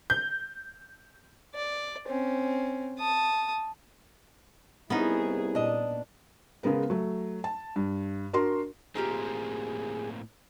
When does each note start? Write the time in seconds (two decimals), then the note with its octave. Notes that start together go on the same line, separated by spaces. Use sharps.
0.10 G6
1.55 D5
2.06 C4 C#4
2.99 A5 D#6
4.90 C2 B3 C#4 D#4 E4 G#4
5.55 A#2 D4 D#5
6.63 C#3 G#3 B3 A#4 B4
6.90 F#3 A3
7.44 A5
7.76 G2
8.33 D4 F#4 A#4 C6
8.95 A2 A#3 C4 D#4 F4 G4 G#4